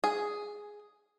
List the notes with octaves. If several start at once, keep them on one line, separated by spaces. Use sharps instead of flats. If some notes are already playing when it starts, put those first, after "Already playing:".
G#4